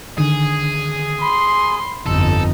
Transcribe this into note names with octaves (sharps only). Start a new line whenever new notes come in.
D3 D#3 G#4
B5 C6
G1 F2 D#4 A4